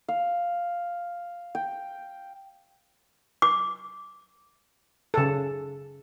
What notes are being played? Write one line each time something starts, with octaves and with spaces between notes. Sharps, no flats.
F5
G5
D6
C#3 A4